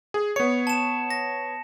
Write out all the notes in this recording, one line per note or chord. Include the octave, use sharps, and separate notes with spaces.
G#4
B3 C#5 C#7
A5 E7
A#6